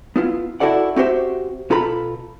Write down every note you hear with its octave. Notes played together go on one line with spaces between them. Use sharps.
B3 E4 F4
E4 F#4 A4 D5 F#5
C4 F#4 G4 C5 E5
B2 F4 A4 A#5 B5